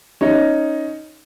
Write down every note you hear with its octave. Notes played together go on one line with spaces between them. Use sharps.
C#4 D#4 D#5